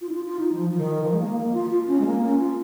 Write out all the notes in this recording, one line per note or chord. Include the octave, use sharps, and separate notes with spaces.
F4
D#4
F4
F4
D#4
F3
F3
D#3
F3
G#3
A#3
A#3
F4
F4
C#4
G#3
A#3
C#4
F4